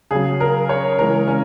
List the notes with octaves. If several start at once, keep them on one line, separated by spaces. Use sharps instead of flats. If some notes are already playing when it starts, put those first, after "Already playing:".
C#3 F#3 G#4
A#4
C#5
C#3 E3 G#3 A#4
C#4